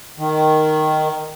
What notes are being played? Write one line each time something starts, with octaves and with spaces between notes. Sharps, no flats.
D#3